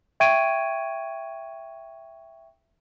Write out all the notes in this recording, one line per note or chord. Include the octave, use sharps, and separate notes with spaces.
E5 G5 C#6 G#6 D7 D#7